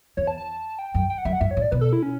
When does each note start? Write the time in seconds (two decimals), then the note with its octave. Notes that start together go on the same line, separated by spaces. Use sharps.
0.17 E2 C#5
0.27 A5
0.38 A5
0.79 G5
0.94 F#2
1.10 G5
1.18 F#5
1.25 F#2 E5
1.33 F#5
1.41 G2 E5
1.51 C#5
1.57 A2
1.62 D5
1.72 B2 B4
1.81 A4
1.93 E4
2.03 C#4